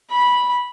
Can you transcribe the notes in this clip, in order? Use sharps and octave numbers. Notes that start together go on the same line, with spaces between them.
B5